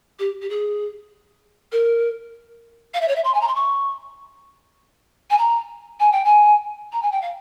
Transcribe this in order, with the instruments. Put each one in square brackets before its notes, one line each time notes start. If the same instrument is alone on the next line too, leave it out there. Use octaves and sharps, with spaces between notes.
[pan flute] G4
G4
G#4
A#4
F5
E5
C#5
E5
C6
G#5
A#5
C6
C#6
G#5
A#5
G#5
G5
G#5
A#5
G#5
G5
F5